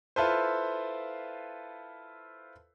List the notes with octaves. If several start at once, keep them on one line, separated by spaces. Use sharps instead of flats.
E4 F4 A4 B4 C5